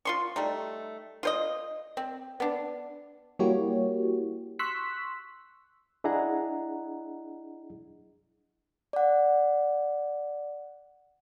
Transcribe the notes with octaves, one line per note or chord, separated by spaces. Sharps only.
F4 C6 C#6
G3 A3 D#4
F4 C5 D#5
C4
B3 D4
G3 A#3 E4 F#4 G4 C#5
C6 C#6 E6 F#6 B6
D4 E4 G#4 D#5 F#5 A#5
D5 F#5